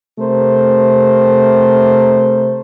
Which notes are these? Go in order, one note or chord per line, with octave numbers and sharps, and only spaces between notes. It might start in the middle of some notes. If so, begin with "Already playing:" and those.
C3 A3 A#4 C5